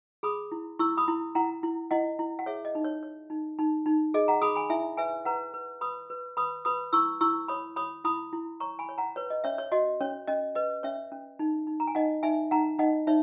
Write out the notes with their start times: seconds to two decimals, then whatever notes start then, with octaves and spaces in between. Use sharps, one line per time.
0.23 G#4 B5 D#6
0.52 E4
0.79 E4 C#6 E6
0.97 B5 D#6
1.08 E4
1.35 E4 F#5 A#5
1.63 E4
1.91 E4 D#5 F#5
2.19 E4
2.39 F#5
2.46 G#4 C#5 E5
2.65 D#5
2.75 D#4
2.84 C#5
3.03 C#5
3.30 D#4
3.59 D#4
3.86 D#4
4.14 G#4 D#5
4.28 F#5 A#5
4.42 G#4 B5 D#6
4.55 G#5 B5
4.70 E4 E5 G#5
4.98 B4 E5 G#5
5.25 B4 F#5 A#5
5.54 B4
5.81 B4 B5 D#6
6.10 B4
6.37 B4 B5 D#6
6.65 B4 B5 D#6
6.93 E4 C#6 E6
7.21 E4 C#6 E6
7.48 C#5 B5 D#6
7.76 C#5 B5 D#6
8.05 E4 B5 D#6
8.33 E4
8.60 C#5 A#5 C#6
8.79 G#5 B5
8.89 C#5
8.98 F#5 A#5
9.16 B4 C#5
9.30 D#5
9.44 C#4 C#5 E5
9.58 C#5
9.72 F#4 D#5
10.01 C#4 C#5
10.27 C#4 D#5
10.55 B4 D#5
10.83 C#4 C#5 E5
11.12 C#4
11.39 D#4
11.67 D#4
11.80 A#5
11.87 G#5
11.95 D#4 D#5 F#5
12.23 D#4 E5 G#5
12.51 D#4 F#5 A#5
12.79 D#4 D#5 F#5
13.07 D#4 C#5 E5